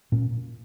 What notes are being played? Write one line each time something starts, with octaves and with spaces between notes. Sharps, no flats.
A#2 C#4